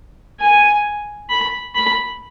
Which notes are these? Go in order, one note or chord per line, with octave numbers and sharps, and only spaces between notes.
G#5
B5
B5